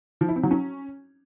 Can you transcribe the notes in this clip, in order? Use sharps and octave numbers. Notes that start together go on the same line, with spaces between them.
F3
E4
C4
F#3
C#4